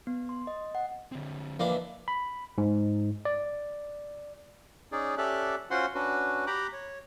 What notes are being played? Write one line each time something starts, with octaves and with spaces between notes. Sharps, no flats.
B3
C6
D#5
F#5
D3 C4
E3 F3 A#3 D4 D#5 F5
B5
G#2
D5
C#4 D#4 G#4 D5
C#4 G4 A4 D5 E5 F#6
C#4 F4 F#4 C5 F#5 C6
C#4 D4 F#4 B4
G4 G5 A#5 B5 D6 F#6
C#5